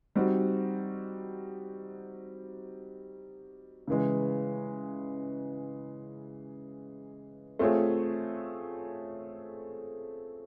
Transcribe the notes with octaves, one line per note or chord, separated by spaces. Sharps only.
G3 C4 D#4 F#4
C#3 E3 G#3
A3 C4 F4 G#4 C#5